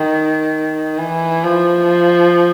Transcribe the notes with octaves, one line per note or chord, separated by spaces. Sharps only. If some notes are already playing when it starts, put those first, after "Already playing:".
Already playing: D#3
E3
F3